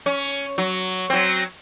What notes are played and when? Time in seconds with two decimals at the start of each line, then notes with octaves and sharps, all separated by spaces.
0.06 C#4
0.58 F#3
1.10 F#3 C4